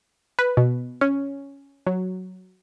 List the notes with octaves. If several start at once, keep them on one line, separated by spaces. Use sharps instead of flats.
B4
B2
C#4
F#3